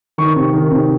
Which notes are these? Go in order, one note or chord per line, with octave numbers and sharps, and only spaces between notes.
D#3 C#6
C3
D#3
C3